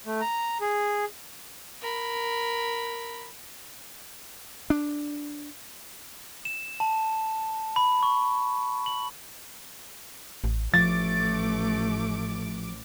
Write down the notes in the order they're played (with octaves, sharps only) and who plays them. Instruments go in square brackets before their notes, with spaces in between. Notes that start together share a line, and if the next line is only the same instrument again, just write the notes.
[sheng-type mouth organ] A3
A#5
G#4
[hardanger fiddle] A#4 B5
[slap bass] D4
[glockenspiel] E7
A5
B5
C#6
F#7
[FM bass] A1
[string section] A1 D6 [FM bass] F3 [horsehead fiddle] A3 [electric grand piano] A6